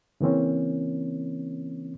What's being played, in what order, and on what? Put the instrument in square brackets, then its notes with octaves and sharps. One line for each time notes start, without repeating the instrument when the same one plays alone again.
[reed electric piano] C#3 E3 A#3 C4 C#4